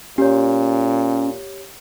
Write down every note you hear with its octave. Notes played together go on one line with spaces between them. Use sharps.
A#2 C#4 G4 C#5